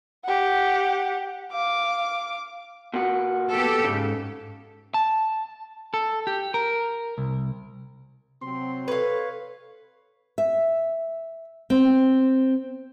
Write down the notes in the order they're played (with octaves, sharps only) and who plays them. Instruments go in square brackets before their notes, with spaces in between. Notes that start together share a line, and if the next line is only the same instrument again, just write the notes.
[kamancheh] G4 F#5
F5 D6
[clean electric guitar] A#2 F#4
[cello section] B3 G4 A4
[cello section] G#2 [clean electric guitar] C#3
[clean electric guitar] A5
A4
G4
A#4
C2
[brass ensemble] C3 F#3 C4 [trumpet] C6
[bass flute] A4 [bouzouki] B4 F5 [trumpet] C#5
[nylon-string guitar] E5
C4